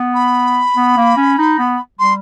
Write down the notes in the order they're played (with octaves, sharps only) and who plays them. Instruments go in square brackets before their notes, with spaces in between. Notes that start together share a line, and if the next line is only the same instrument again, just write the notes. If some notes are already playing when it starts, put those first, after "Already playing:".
Already playing: [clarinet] B3
[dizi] B5
[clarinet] B3
A#3
C#4
D#4
B3
[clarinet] G3 [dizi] C6